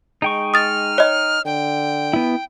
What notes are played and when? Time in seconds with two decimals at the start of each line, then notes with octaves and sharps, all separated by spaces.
0.22 G#3 D#4 G5 C#6
0.54 D#6 F6 A6
0.98 C#5 D#5
1.45 D3 G5
2.13 B3 E4